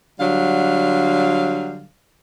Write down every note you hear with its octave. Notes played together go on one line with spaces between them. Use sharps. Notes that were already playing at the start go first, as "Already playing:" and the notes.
D3 F#3 G3 F5